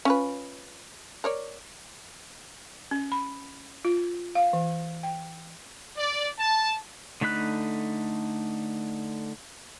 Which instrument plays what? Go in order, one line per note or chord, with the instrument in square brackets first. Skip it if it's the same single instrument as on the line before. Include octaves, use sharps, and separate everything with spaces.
[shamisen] C#4 F4 B4
A#4 C#5 D5
[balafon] C#4
B5
F4
F5
E3
G5
[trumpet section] D5
A5
[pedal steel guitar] D3 A3 D#4 B5 F#6